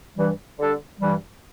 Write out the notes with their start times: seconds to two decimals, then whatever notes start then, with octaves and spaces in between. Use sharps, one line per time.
0.15 G2 E3 G3
0.58 D3 G3 D4 A4
0.99 G2 E3 G3